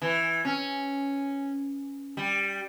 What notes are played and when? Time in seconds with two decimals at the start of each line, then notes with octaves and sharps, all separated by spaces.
0.02 E3
0.45 C#4
2.17 G3